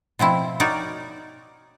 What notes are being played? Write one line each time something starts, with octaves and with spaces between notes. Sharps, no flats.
B2 F3 C4 E4
D#4 F#4 A#4 C#5 D5